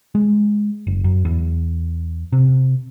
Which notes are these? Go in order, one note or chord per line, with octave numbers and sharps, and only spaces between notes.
G#3
F#1
F#2
E2
C3